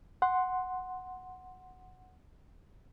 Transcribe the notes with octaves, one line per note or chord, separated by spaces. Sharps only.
F#5 C6